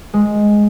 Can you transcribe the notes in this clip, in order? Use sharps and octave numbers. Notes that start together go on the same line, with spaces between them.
G#3